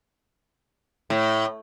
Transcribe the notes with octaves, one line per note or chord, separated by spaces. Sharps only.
A2